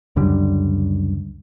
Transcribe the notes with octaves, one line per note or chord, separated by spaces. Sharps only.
C#2 F#2 D3 G3